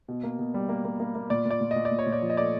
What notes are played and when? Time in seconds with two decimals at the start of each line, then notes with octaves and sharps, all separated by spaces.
0.08 B2
0.23 A#3
0.39 B2
0.54 G3
0.69 A#3
0.85 A#3
1.00 A#3
1.15 A#3
1.30 A#2 D5
1.46 A#2
1.51 D5
1.61 A#2
1.71 D#5
1.76 A#2
1.85 D5
1.91 A#2
1.99 C#5
2.07 A#2
2.12 D5
2.22 F3
2.30 D#5
2.37 A3 D5